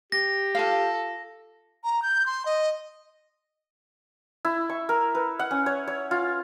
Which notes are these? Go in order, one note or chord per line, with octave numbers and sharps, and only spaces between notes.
G4 A#6
F4 A4 F5
A#5
G6
C6
D#5
E4
C#6
A#4
B4
F#5
C#4
C#5
C#5
F4